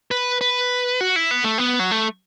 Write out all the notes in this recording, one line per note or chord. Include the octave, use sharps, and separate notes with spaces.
B4
B4
F#4
E4
B3
A3
B3
F#3
A3